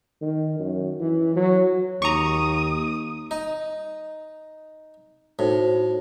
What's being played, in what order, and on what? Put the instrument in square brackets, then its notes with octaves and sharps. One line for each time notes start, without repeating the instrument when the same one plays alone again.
[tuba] D#3
F#2
E3
F#3
[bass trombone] D#2 [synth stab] A#5 C#6 [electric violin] D#6
[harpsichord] D#4
[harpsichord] A2 [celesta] D#4 F#4 C5